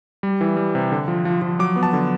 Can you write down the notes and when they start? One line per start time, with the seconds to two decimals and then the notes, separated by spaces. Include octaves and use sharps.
0.23 G3
0.41 E3
0.57 G3
0.75 C3
0.92 D3
1.08 F3
1.25 F3
1.42 F3
1.59 F#3 D6
1.76 B3
1.83 A5
1.93 D3